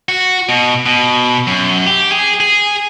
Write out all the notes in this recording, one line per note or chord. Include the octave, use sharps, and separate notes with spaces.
F#4
B2
B2
F#2
G4
G#4
G#4